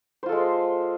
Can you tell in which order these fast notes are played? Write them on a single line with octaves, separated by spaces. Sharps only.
C5 F4 A4 G#3